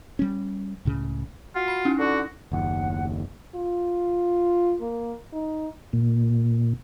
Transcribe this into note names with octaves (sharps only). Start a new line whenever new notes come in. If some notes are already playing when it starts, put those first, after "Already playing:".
G3 C#4
C#2 A2 C#3
F4 F#4
B5 C7
C#4 D#4 E4
D3 F#4
F#1 D#2 F#5
F4
A#3
D#4
A#2